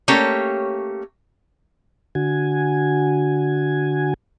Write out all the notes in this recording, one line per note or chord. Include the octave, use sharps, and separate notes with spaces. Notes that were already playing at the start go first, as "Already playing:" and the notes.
A3 A#3 C#4 G4 C#5
D3 F#4 G#5